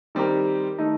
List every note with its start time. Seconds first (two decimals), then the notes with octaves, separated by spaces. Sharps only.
0.15 D#3 G3 C4 G4 A#4
0.78 D#3 A3 D#4